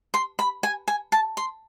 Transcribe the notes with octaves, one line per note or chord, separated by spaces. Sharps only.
C6
B5
G#5
G#5
A5
C6